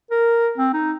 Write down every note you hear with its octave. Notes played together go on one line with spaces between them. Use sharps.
A#4
C4
D#4